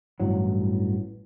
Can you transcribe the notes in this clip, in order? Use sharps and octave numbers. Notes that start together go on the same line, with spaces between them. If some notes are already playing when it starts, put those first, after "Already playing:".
A1 G2 E3 F#3